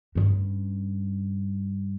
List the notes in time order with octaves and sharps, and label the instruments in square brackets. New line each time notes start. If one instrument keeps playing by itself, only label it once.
[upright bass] G2 C#4